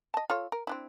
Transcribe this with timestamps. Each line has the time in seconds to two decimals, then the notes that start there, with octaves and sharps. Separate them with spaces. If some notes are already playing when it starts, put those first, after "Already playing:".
0.14 D#5 A5
0.30 F4 A4 C#5
0.52 A#4
0.67 C4 D4 E4